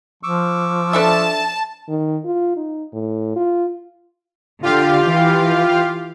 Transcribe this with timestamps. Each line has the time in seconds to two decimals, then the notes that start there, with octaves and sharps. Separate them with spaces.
0.23 F3 C#6 D6 E6
0.93 D4 A4 E5 A5
1.88 D#3
2.25 F4
2.57 D#4
2.93 A2
3.36 F4
4.63 D3 F4 G4 F5
5.09 E3